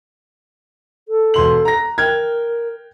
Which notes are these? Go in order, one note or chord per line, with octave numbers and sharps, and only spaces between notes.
A4
E1 C6 F#7
A#5 A#6
A#4 G5 F6 G#6